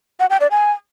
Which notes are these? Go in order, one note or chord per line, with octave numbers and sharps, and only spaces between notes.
F#5
G5
D5
G#5